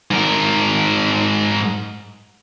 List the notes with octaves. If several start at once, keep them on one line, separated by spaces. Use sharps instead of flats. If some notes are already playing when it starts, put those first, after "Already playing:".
G#2 A#4